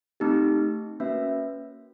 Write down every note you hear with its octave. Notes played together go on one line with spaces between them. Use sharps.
A3 C4 D#4 G4
A#3 C#4 F#4 B4 E5